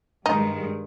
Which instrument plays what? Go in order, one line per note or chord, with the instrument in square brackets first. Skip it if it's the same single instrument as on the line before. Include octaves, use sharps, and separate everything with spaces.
[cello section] G2 D#3 G#3 [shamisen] D#4